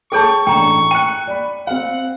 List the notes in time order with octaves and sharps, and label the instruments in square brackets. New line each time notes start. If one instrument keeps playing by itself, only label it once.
[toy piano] G#4 A4 C#5 [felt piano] G5 A5 [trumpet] C#6
[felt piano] A1 A2 D4 [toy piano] G5 A#5
[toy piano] G5 [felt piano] F#6 C#7 D#7
[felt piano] D5 B5
[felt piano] C4 F5 [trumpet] F#5